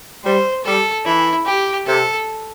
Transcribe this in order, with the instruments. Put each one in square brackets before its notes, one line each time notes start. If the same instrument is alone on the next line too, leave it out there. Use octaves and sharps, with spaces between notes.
[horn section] G3 [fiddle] C5
[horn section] G3 [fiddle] A4
[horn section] E3 [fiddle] E4
[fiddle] G4
[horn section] C3 [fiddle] A4